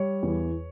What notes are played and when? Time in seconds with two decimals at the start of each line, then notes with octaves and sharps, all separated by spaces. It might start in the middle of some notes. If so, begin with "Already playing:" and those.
Already playing: G3 C#5
0.23 E2